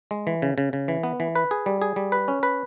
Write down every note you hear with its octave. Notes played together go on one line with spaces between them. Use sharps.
G#3
E3
C#3
C#3
C#3
E3
B3
E3
B4
G#4
G3
G#4
G3
B4
C#4
B4